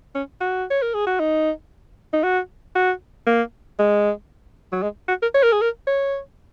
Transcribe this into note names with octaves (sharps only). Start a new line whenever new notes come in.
C#4
F#4
C#5
A#4
G#4
F#4
D#4
D#4
F#4
F#4
A#3
G#3
F#3
G#3
F#4
A#4
C#5
A#4
G#4
A#4
C#5